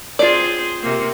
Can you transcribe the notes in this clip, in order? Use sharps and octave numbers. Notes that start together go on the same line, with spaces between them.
C4 F4 G#4 C5 D5
C3 A#3 C4